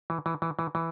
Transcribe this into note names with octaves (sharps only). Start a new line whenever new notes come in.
E3
E3
E3
E3
E3